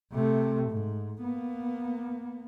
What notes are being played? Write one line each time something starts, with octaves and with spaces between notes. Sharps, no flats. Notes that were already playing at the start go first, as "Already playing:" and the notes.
C3 A3
G#2
A#3 B3